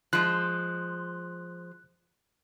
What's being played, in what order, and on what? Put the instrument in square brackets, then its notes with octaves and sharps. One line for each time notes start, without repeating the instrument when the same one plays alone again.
[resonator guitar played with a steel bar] F3 G#3 [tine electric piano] F#6